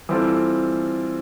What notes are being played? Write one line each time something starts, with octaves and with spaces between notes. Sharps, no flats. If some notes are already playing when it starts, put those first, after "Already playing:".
E3 G3 C4 F4 A4